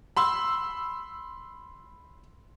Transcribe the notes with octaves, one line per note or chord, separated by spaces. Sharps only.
B5 C6 E6